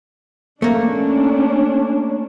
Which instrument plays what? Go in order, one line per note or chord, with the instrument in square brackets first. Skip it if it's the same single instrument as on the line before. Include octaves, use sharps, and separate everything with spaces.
[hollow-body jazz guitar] A3 A#3 [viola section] C#4 D4